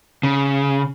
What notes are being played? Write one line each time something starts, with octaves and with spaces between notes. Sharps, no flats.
C#3